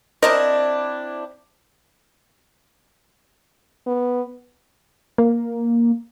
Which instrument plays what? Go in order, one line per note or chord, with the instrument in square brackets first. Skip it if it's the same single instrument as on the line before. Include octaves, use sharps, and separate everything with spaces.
[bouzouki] C4 D4 E4 [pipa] A#4 C5 D#5
[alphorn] B3
[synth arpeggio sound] A#3